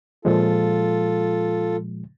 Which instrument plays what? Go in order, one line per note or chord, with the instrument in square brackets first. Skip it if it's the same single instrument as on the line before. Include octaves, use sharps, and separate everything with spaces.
[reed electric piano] A#2 F3 G#3 [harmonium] F4 A4